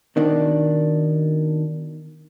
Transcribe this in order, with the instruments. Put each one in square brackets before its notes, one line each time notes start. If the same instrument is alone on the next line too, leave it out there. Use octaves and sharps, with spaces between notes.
[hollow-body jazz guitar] B2 D#3 D4